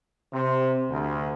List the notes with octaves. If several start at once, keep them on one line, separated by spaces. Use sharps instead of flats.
C3
D2